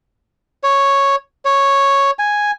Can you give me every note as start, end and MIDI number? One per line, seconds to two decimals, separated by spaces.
0.63 1.16 73
1.45 2.11 73
2.19 2.51 80